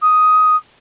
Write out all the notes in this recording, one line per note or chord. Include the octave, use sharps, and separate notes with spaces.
D#6